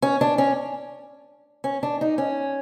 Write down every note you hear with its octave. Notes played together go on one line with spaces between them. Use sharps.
C#4
D4
C#4
C#4
D4
D#4
C#4